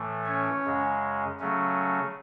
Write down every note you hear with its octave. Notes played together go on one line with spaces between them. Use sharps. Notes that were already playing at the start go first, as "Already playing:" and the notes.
Already playing: A2 E3 A3
C#4 C#5
F#2 C#3 G#3
C#3 F#3 A3 C#4